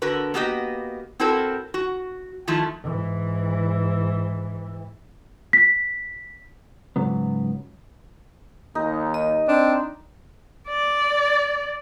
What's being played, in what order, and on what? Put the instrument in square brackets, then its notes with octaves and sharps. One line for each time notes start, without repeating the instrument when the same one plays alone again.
[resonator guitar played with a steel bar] D3 F#4 A#4 B4
A#3 B3 F#4 G4 D#5
C4 E4 F#4 A4 A#4 C5
F#4
D#3 F3 A3 E4 F4
[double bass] G#2 E3
[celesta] B6
[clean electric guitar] G#2 C#3 F#3 B3
[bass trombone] D#2 [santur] D#4
[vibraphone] D#5
[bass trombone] C4 [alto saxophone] D4
[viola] D5